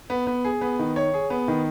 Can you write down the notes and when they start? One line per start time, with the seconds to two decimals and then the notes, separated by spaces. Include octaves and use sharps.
0.10 B3
0.27 B3
0.44 G#4
0.61 B3
0.79 D#3
0.96 C#5
1.14 G#4
1.30 B3
1.48 D#3